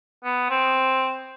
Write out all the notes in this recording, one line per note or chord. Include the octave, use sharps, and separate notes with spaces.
B3
C4